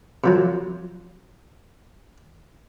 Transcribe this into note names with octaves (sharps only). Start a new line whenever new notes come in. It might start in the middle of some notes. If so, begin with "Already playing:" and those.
C3 F3 F#3